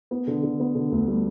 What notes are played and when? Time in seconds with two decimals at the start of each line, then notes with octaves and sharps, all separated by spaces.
0.11 B3
0.27 D3
0.43 D3
0.60 B3
0.75 D3
0.92 D2
1.08 G3